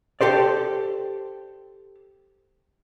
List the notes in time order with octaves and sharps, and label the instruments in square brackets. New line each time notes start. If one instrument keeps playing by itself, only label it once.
[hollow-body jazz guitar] G4 A4 C5 D5